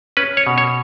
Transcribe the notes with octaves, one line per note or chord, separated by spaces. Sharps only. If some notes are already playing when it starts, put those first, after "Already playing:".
C#4 B4
C#5
B2
C#5